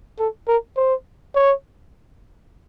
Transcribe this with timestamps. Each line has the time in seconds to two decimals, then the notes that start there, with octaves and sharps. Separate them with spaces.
0.19 A4
0.48 A#4
0.77 C5
1.35 C#5